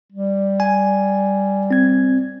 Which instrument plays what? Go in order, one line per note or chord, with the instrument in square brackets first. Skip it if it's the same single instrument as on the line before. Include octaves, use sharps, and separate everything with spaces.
[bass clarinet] G3
[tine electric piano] G#5
C4 G#6